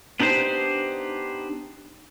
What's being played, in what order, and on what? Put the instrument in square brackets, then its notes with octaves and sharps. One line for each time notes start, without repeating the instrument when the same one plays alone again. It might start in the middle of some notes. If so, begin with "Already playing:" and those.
[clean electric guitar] B3 D4 D#4 G4 C5